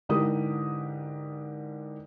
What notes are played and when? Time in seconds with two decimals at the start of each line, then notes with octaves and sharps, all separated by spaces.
0.09 G#2 D3 E3 G4 A#4 D#6